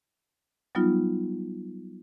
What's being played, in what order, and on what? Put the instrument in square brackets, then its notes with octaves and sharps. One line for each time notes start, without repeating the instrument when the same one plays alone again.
[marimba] F#3 G3 B3 D#4 F4